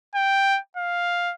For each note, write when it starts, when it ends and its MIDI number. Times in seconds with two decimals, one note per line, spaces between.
0.15 0.59 79
0.76 1.33 77